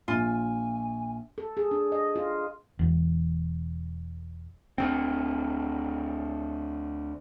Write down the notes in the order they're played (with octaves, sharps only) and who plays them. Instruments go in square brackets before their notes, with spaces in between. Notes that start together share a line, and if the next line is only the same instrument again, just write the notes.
[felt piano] A#1 [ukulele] F4 [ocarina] G#5
[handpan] A4
G#4
D4
D#5
F4
[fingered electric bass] E1 E2
[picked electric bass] D2 C4